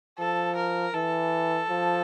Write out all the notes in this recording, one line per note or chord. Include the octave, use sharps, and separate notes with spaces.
F3 A4
A#4
E3 A4
F3